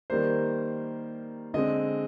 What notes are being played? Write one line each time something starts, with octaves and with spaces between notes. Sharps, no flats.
D#3 G3 A#3 C5
D3 G#3 C4 D#5